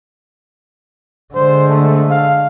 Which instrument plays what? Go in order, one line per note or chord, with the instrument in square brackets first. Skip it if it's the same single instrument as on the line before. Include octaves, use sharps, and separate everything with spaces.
[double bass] D3 G#3 [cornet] C5
[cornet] A3
F5